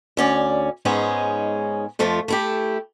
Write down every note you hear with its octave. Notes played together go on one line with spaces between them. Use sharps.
D2 C#4 D5
G#2 G#3 B3 C#4 D#4 G#4
F2 F3 A3 F4
A3 E4 G4